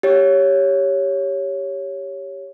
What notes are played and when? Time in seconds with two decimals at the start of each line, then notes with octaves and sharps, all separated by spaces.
0.03 G4 C#5